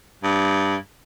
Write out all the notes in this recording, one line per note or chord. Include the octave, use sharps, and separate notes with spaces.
G2